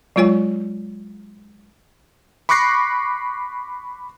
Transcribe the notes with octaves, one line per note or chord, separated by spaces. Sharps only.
F#3 G#3 F4 C#5 G#5
B5 C#6 D6 F#6 A#6 C7